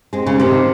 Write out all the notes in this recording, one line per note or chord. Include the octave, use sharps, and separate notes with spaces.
G#3 C4
C#3
C3 D#3